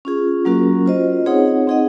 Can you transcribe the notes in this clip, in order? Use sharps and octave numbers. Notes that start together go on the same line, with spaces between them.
C#4 F4 G#4
F#3 A#3 C#4 F#4 A#4
F4 C5 D#5
C4 D#4 G#4 C#5 F#5
C4 D#4 G#4 D#5 F#5